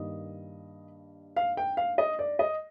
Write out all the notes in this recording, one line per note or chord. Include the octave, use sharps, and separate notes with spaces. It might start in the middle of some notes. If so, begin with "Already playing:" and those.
Already playing: G2 D#3 A#3 D#5
F5
G5
F5
D#5
D5
D#5